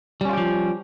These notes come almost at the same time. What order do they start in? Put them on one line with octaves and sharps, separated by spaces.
G3 C#4 F4 G4 F3